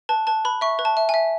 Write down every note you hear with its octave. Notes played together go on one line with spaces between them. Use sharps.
B4 A5
B4 A5
B4 B5
E5 C#6
B4
A5
E5
E5 G#5